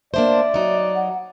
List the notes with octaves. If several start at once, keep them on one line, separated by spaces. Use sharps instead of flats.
A#3 D4 C5 D5 E5
F#3 D#4
F#5